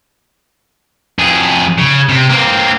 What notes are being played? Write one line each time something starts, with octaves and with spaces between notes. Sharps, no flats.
F2 G#4
C#3
C3
A#3 C4